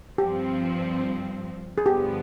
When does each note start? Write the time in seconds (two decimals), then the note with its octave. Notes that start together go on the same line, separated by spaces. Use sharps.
0.18 G2 F3 C4 G4
1.78 G#4
1.86 G2 D3 F3 B3 G4